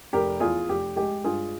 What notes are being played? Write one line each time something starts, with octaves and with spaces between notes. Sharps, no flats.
F1 G4 A#4
E2 F4 G#4
F1 G4
G#3 G4
G2 F4 G#4